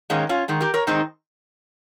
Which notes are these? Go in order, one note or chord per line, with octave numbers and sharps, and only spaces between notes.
G#2 D#3 G#3 A#3 C#4
C#4 F4
G#2 D#3 G#3
G4 A#4
A#4 C#5
G#2 D#3 G#3 C4 D#4